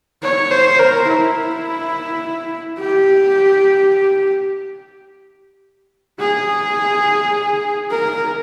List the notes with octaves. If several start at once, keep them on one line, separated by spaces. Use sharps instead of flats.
C#5
C5
A#4
E4
G4
G#4
A#4